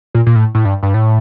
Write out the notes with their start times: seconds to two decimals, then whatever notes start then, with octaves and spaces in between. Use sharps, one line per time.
0.15 A#2
0.26 A#2
0.36 A2
0.55 A2
0.65 G2
0.83 G2
0.94 A2